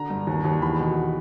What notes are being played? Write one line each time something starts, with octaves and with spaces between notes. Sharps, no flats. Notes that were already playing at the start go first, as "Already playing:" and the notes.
Already playing: D3 A#5
G2
D#2
D#2
E2 B5
B2